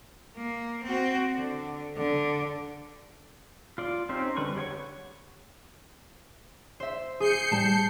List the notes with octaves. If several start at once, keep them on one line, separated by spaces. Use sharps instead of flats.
A#3
C4 F#4
D3
D3
F4 D5
C4 C#4 D#4 G4 C5
D3 G3 B4 C#6
G4 C#5 F#5 C#6
C5 E5
G#4 G6 C7 C#7
A2 G3 A5